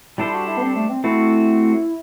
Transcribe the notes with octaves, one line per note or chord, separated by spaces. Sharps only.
G3 D4 E4 A4 C5
F#4
E4
B3
C4
A3
C4
A3 C4 E4 F#4